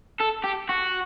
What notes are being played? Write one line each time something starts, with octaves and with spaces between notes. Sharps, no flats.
A4
G4
F#4